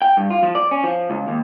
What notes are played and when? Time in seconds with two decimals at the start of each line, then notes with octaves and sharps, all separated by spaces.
0.02 G5
0.17 G2
0.30 F4
0.43 F3
0.55 D5
0.71 C#4
0.84 F3
1.10 C#2
1.28 D#2